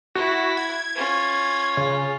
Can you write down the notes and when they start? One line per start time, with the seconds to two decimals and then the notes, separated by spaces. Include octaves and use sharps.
0.15 E4 F#4
0.57 G#6
0.95 C#4 F4
1.77 C#3